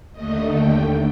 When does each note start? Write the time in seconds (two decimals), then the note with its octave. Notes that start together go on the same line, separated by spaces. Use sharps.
0.12 D#2 D3 A3 D#5
0.53 G5